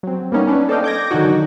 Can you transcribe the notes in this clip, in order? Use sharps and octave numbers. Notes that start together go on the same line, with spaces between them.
F#3 C4
G3 A#3 B3 C#4 D#4
C#4 D4 B4
A4 C5 D5 D#5 F5 G5
D6 G6 G#6 A#6
D3 D#3 F#3 D4 D#4 F#4